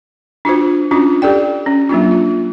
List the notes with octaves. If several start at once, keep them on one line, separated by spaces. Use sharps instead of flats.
D4 F4 F#4 C5
C#4 D4 F4 F#4
G4 A4 D5 G5
C#4
F#3 A#3 D4 F4
F4